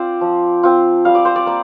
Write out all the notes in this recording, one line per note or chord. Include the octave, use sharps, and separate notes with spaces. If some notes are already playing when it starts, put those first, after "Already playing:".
Already playing: C4 F4 C5 D5
F3
C4 F4
G3 F5
D5
C5
D5
A#3 D5